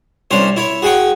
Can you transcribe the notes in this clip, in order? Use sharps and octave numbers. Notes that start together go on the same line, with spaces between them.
C2 C#4 D4 C5 C#5
E4 C#5
F#4 G#4 F#5 G5 C#6